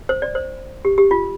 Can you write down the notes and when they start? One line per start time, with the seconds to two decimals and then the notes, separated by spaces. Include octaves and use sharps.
0.09 C5
0.22 D5
0.35 C5
0.85 G4
0.98 G4
1.11 F4